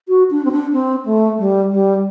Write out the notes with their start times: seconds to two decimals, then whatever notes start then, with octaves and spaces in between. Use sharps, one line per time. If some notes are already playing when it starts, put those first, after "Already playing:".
0.08 F#4
0.31 D4
0.45 C4
0.52 D4
0.73 C4
1.06 A3
1.38 G3
1.71 G3